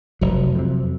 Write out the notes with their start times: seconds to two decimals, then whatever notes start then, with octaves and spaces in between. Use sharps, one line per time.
0.21 F1 F#3
0.55 F2 C3